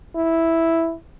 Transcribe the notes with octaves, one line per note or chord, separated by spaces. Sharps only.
E4